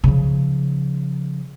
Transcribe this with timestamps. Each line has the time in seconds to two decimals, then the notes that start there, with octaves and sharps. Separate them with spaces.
0.04 C#3 F3